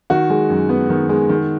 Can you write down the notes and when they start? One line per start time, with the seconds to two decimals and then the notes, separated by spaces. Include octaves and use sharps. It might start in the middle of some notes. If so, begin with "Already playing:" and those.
0.10 D#3 F#4
0.30 G#3
0.50 F#2
0.69 B3
0.90 D#3
1.09 G#3
1.29 D#3